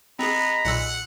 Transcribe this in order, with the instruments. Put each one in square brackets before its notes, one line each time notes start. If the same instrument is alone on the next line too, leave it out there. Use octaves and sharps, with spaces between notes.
[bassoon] G#3 [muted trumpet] B3 [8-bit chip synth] C4 G#4 [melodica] A#5 B5
[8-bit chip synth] B1 A#2 E6 [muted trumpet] F#5